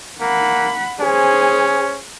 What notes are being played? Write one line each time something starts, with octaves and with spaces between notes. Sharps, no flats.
A#3 F#5 B5
C#4 G#4 C5